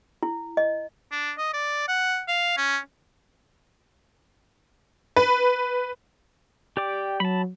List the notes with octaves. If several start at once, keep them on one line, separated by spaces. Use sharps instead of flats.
E4
D#5
D4
D#5
D5
F#5
F5
C#4
B4
G4 D5 G5 D6
F#3 A5 B5